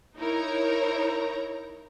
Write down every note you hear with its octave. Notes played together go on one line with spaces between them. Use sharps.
D#4 E4 A#4 C#5 A#5